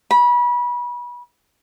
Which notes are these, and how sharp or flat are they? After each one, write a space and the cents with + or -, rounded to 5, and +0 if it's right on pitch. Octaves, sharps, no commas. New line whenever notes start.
B5 -30